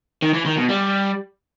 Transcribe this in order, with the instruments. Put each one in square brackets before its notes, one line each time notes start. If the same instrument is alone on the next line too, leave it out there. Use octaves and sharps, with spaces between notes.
[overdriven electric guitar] D#3
E3
D#3
B2
G3